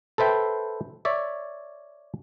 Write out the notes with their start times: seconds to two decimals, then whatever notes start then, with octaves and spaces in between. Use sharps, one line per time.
0.18 A4 B4 C5 E5 G5
1.05 C#5 D5 E5